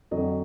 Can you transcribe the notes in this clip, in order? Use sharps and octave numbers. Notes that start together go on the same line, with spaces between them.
F2 D3 F#3 D#5